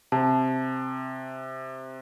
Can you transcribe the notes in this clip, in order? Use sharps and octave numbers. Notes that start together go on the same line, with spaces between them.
C3 A5